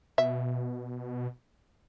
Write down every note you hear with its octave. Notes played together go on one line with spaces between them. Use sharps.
B2 E5